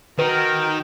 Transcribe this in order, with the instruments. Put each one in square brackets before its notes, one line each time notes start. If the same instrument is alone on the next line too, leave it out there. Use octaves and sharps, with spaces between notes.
[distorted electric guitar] D#3 [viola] F#4 G5 [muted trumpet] A#4 [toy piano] B4